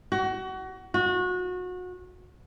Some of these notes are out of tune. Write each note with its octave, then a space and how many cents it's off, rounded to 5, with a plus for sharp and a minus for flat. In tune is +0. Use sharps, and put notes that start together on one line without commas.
F#4 +30
F#4 -30